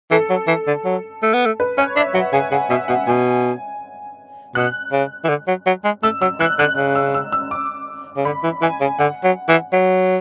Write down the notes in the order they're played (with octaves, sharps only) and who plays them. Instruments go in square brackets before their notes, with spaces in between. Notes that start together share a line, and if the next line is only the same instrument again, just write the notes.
[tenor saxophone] E3 [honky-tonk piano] A4
[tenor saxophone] F#3
E3
D3
F#3
A3
B3
A3
[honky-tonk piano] B4
[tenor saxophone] C#4 [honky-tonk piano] C#5
[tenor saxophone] D4 [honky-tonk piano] E5
[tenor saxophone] F#3 [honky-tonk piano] F#5
[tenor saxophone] C#3 [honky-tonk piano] G#5
[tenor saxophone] C#3 [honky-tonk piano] F#5
[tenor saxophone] B2 [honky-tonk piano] E5
[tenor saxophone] B2 [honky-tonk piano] F#5
[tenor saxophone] B2 [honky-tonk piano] G#5
[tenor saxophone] B2 [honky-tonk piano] F#6
[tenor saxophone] C#3
E3
D3
F#3
F#3
G#3
[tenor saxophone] A3 [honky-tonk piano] E6
[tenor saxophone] F#3 [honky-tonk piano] E6
[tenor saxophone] E3 [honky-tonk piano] F#6
[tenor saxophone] D3 [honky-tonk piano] F#6
[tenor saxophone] C#3
[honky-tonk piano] E6
E6
E6
D6
[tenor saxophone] C#3
[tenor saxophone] D3 [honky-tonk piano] B5
[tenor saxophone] E3
[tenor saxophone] E3 [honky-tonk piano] G#5
[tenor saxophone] C#3
[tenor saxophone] D3 [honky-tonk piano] F#5
[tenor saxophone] F#3
E3
F#3